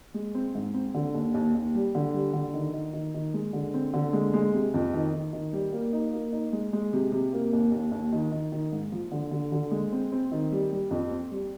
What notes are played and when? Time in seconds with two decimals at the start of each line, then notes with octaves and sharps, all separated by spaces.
0.14 G#3
0.35 C4
0.55 G#2
0.74 C4
0.94 D3
1.14 D#2
1.34 D#2
1.55 D#2
1.75 G3
1.95 D3
2.14 G3
2.33 D3
2.54 D#3
2.73 D#3
2.93 D#3
3.14 D#3
3.34 G#3
3.53 D3
3.74 C4
3.93 D3
4.13 G#3
4.34 G#3
4.53 C3
4.74 F2
4.94 D#3
5.13 D#3
5.33 D#3
5.53 G3
5.72 A#3
5.93 D#4
6.13 A#3
6.32 D#4
6.53 G#3
6.73 G#3
6.93 C3
7.12 C3
7.33 A#3
7.53 D#2
7.72 D#2
7.92 D#2
8.12 D#3
8.32 D#3
8.52 D#3
8.72 G#2
8.92 F3
9.11 D3
9.31 D3
9.52 D3
9.71 G#3
9.92 C4
10.12 C4
10.32 D#3
10.52 G3
10.72 G3
10.91 F2
11.11 C4
11.31 G3